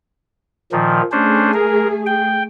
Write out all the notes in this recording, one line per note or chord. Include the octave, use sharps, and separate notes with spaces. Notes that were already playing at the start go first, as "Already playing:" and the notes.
A#2 D#3 F3
A3 C#4 D4 G#4 C5
A#4
G5